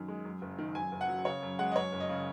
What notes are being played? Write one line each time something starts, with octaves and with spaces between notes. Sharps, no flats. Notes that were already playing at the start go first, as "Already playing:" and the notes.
Already playing: F#2 D#3
G#3
F#2
F#1
D#3
F#2 G#5
F#1
F#5
F#3
C#3 C#5
F#2
G#3 F#5
D#5
F#2 C#5
F#1
D#5
C#3